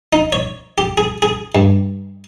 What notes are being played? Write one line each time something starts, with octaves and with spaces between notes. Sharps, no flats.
D#4
C#5
G4
G#4
G#4
G2